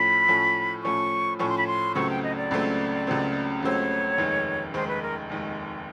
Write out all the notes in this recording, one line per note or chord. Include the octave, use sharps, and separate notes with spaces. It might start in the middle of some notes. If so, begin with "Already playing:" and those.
Already playing: A2 F3 A3 C#4 B5
A2 F3 A3 C#4
A2 F3 A3 C#4 C#6
A2 F3 A3 C#4 C#6
C6
B5
C6
C#2 C#3 F#3 A3 C4 C#6
G5
D#5
D5
C#2 C#3 F#3 A3 C4
C#2 C#3 F#3 A3 C4
C#2 C#3 F#3 A3 C4 C#5
F1 D#2 D#3 G#3
F1 D#2 D#3 G#3 C5
B4
A#4
F1 D#2 D#3 G#3